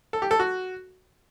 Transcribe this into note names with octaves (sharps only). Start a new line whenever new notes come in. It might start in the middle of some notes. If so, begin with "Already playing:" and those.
A4
G4
A4
F#4